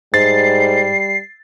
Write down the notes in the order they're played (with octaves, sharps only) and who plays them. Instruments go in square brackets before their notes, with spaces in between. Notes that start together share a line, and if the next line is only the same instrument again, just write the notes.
[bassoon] G#2 [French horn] G3 [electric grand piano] A6 [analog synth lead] C7